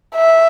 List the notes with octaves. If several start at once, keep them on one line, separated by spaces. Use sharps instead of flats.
E5